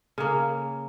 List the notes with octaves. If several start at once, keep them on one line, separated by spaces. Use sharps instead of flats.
C#3 A#3